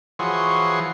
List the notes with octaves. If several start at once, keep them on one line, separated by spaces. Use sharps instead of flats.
E3 F3 F#4 G#4 C#5 C6